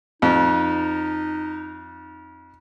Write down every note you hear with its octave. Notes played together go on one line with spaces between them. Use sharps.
F2 D#4